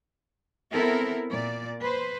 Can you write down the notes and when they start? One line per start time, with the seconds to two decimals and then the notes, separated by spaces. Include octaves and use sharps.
0.73 B3 C4 E4 A4 A#4
1.31 A#2 D5
1.81 B4 C5